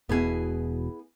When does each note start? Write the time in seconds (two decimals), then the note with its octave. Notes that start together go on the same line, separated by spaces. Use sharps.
0.09 E1 B2 B3 E4 G#4